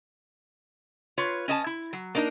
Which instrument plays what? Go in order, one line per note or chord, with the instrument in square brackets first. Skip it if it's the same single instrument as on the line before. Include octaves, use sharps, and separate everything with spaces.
[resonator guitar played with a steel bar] F4 B4 C#5
C#4 D#5 A5
E4
F#3
A#3 D4 D#4 A4 A#4